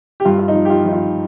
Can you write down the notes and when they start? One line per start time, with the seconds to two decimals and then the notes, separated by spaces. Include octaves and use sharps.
0.20 G4
0.25 G2 F4
0.39 F4
0.48 D#4
0.54 F3
0.65 G4
0.70 F4
0.85 F3 D#4
0.93 F4